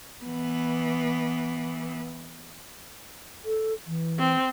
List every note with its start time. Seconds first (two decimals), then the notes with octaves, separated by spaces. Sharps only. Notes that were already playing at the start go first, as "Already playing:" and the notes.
0.24 E3 B3
3.45 A4
3.87 E3
4.19 C4